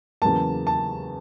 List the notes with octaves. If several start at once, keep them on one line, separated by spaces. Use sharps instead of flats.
E2 C#3 F#3 A#3 A5
A5